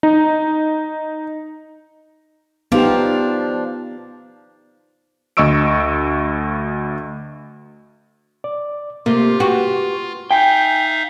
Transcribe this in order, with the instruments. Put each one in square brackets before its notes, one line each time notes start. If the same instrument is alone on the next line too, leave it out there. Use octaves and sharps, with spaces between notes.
[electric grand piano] D#4
[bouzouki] F3 D4 [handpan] B3 D#4 G4
[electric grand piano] D2 D#5 C#6 E6 D7
[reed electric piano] D5
[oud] C3 [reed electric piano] A3 A#3 [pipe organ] F4
[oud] F#4 [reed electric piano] G4 B4
[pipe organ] D#4 E5 F5 [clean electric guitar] G5 [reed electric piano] G#5